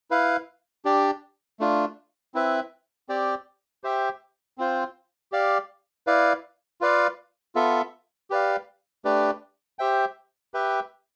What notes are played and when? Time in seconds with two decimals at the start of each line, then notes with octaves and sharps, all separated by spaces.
0.11 E4 B4 F5
0.85 D4 G4 D5
1.60 A3 D4 F4
2.34 C4 E4 B4 E5
3.09 C4 G4 D5 G5
3.84 G4 C5 E5 G5
4.58 C4 F4 C5
5.32 G4 D5 F5
6.07 E4 B4 D5 F5
6.81 F4 B4 D5 F5
7.55 B3 F4 A4 E5
8.30 G4 B4 D5 F5
9.05 A3 D4 G4 B4 D5
9.79 G4 C5 E5 G5
10.54 G4 B4 E5 G5